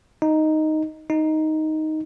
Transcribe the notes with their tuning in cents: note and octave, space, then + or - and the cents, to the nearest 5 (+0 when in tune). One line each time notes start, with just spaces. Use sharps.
D#4 +0
D#4 +5